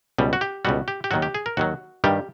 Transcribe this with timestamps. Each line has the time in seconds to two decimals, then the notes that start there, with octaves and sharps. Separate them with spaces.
0.18 C#2 B2 G3
0.33 F#4
0.41 G4
0.65 C#2 B2 G3 F#4
0.88 G4
1.04 G4
1.11 D#2 D#3 F#3 F#4
1.22 G4
1.35 G#4
1.46 A#4
1.57 D#2 D#3 F#3 F#4
2.04 G2 D#3 G3 G4